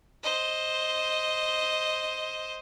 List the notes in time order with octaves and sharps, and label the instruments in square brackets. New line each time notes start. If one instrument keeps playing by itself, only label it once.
[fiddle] C5 D#5